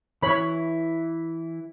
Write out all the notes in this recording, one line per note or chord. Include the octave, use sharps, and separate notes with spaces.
E3 E4 C#5 B5